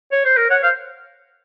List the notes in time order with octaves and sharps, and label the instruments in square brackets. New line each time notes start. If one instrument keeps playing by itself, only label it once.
[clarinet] C#5
C5
A#4
[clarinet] C#5 [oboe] F#5
[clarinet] C5 [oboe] F5